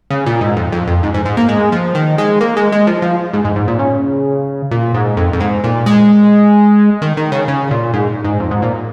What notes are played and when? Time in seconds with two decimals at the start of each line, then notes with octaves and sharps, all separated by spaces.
0.10 C#3
0.26 A#2
0.41 G#2
0.57 F2
0.72 F2
0.87 F2
1.03 G#2
1.14 G#2
1.25 G#2
1.37 A#3
1.48 G#3
1.72 F3
1.95 D#3
2.18 G#3
2.41 A#3
2.56 G#3
2.72 G#3
2.87 F3
3.02 F3
3.33 G#2
3.45 G#2
3.56 G#2
3.68 A#2
3.79 C#3
4.71 A#2
4.94 G#2
5.17 F2
5.33 F2
5.40 G#2
5.64 A#2
5.86 G#3
7.02 D#3
7.17 D#3
7.32 C#3
7.48 C#3
7.71 A#2
7.94 G#2
8.24 G#2
8.40 F2
8.51 G#2
8.62 A#2